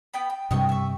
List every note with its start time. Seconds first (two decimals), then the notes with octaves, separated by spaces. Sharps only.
0.14 B3 G5 B5
0.30 G5
0.51 G2 C3 G3 G4 D#5 C#6
0.69 E5 C#6